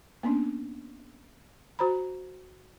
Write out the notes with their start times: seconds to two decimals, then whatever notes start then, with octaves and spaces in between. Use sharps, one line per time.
0.23 A#3 B3 C#4 D4
1.79 F#4 C5 A#5 B5